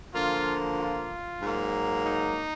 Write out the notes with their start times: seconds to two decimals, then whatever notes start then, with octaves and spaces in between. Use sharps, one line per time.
0.14 D3 F3 A#3 F4
0.78 F4
1.41 G#2 F#3 A#3
2.06 D#4